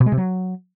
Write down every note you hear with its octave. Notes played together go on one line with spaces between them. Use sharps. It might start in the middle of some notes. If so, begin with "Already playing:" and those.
B2
G#3
C3
F#3